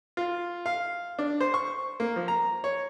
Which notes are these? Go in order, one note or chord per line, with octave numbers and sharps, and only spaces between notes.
F4
F5
D4
C5
C#6
A#3
F3
A#5
C#5